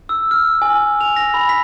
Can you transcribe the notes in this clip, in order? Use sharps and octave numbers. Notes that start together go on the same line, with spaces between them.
E6
F6
G#5
F7
A#6
B5
B6